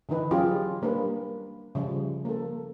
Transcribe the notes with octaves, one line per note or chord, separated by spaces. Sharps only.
D3 E3 D#4 B4
F#3 C#4 F4 G4 G#4
G3 A#3 D4 B4
C#3 F3 G3
A#3 A4